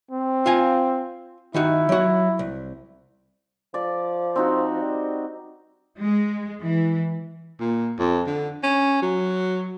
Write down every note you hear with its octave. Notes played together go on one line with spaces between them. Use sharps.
C4
F4 F5 G#5
D#3 D#4 E4 F#4
F#3 F#4
C2
F3 D5
C4 D#4 F#4
G3
G#3
E3
A#2
F2
D3
C#4
F#3